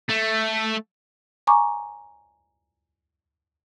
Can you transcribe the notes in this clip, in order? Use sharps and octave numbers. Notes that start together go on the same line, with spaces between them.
A3
G#5 A#5 C#6 D6